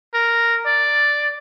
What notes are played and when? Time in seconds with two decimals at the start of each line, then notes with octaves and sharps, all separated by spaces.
0.14 A#4
0.66 D5